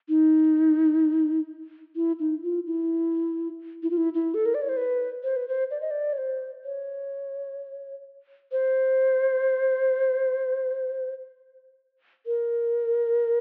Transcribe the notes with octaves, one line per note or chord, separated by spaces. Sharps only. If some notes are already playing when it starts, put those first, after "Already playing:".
D#4
E4
D#4
F4
E4
E4
F4
E4
E4
A4
A#4
D5
C#5
C5
B4
C5
B4
C5
D5
D#5
D5
C#5
C5
C#5
C5
A#4